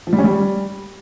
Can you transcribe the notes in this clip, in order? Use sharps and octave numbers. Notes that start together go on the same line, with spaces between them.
F3
G3
C#4
G3